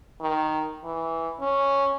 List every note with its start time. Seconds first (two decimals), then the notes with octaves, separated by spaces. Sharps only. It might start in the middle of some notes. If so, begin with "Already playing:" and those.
0.21 D#3
0.84 E3
1.41 C#4